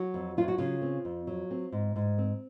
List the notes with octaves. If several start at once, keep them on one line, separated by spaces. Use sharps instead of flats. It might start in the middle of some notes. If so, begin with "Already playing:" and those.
Already playing: F#3 F#4
F2
F#3 F4
F#4
C#3 F4
C4
F2
F#3
C4
G#2
G#2
C4